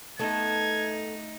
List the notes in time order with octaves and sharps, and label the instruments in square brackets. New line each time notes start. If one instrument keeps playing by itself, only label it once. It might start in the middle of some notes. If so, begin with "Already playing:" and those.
[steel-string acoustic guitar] A3 [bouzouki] B3 A4 [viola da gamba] D#4 [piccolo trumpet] G#6